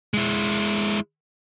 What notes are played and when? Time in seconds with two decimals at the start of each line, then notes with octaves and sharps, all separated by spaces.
0.14 G#3 E4